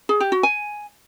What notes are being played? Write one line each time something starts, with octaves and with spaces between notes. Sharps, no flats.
G#4
G4
F#4
G#5